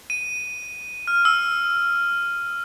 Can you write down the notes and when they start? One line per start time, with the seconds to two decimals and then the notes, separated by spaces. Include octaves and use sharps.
0.10 D#7
1.07 F6
1.25 E6